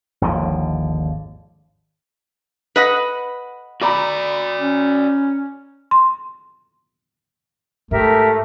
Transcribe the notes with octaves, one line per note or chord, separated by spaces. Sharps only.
G#1 D#2 D3 F3
B4 D#5 F#5
F#4 D5 A#5 B5 D6
C#4
C6
G#2 A3 G4 A#4 E5